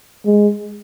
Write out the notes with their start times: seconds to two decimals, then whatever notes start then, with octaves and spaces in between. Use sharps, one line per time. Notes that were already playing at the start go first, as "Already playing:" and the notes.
0.26 G#3